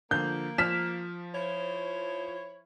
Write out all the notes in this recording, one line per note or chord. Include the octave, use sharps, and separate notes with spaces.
D3 F3 A#3 G6
F3 F6 B6 E7
E4 C5 C#5